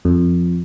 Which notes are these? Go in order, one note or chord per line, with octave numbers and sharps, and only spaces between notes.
F2